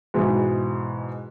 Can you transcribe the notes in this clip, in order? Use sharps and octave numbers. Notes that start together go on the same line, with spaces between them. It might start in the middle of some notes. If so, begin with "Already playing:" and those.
G#2 B2 E3